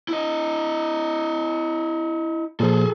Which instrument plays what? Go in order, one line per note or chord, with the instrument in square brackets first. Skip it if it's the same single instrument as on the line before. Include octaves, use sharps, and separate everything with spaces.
[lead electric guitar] E4 D#5
[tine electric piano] A#2 F3 [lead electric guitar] G#4 A4